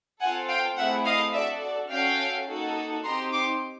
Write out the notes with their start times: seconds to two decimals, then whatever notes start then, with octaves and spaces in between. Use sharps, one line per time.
0.20 C4 F4 A4 F#5 G#5
0.49 F5 G5
0.77 A3 C4 E4 G#4 E5 F#5
1.05 D#5 F5
1.34 D4 F#4 A4 D5 E5
1.62 D5
1.91 C#4 F#4 A4 F5 G5
2.47 A#3 D#4 F#4 A4
3.04 C4 D#4 G4 A#5 C6
3.32 C6 D6